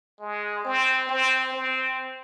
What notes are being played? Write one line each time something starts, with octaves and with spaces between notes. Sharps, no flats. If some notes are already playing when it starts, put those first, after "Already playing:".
G#3
C4
C4
C4